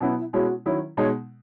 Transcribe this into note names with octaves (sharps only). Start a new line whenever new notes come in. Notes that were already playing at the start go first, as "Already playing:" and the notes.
B2 F#3 B3 C#4 E4
E4
B2 G#3 C#4 E4 F#4
D#3 F#3 C#4 E4
B2 G#3 D#4 C#5